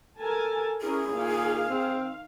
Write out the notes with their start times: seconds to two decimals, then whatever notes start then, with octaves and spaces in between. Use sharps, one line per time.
0.18 A4 A#4 G#5 A5
0.81 C#4 E4 G#4 A#4
1.12 A#2 D#3 F5
1.68 C4